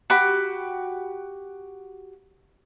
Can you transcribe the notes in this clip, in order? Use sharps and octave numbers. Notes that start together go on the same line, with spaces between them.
F#4 G4 B5